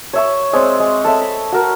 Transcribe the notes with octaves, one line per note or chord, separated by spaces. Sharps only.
C#5 E5 C#6
G#3 C4 C#5 D5
G#3
A4 C#5 E5
B5
F#4 A#4